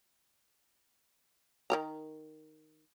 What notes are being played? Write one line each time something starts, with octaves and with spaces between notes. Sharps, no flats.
D#3 A#4 A#5